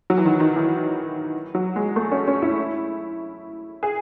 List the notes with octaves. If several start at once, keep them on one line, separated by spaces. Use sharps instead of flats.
F#3
E3
D#3
D#3
E3
F#3
G#3
A3
C#4
C#4
E4
G#4